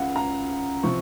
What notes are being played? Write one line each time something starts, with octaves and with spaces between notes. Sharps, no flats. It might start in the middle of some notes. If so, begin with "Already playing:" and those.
Already playing: C#2 C#3 F5 F#5
A#5
C3 F3 C4 C#6